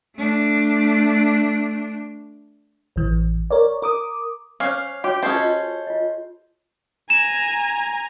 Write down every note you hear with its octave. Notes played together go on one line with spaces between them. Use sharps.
A3 D4
A1 E3
A#4 C#5 D5
A#4 D6 D#6
C#4 C5 C#5 F5 D6
F#4 G4 C#5
C#4 G#4 A4 C5
F4 D#5
F4 D#5
G#5 A#5 E7